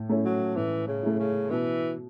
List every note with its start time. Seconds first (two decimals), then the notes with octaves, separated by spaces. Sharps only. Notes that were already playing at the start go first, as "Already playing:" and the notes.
Already playing: A2
0.09 A3 C#4 E4
0.25 F#3
0.56 A2 E3
0.88 C#3
1.03 A3 C#4 E4
1.19 C#3
1.50 B2 E3